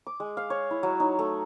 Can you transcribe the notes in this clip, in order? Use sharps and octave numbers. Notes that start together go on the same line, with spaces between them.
D6
G#3
F5
C#5
E4
F#3
D#4
A3